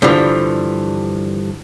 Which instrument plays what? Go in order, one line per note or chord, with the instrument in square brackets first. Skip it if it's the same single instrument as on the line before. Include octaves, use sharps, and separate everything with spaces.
[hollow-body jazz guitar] G2 D3 E3 F3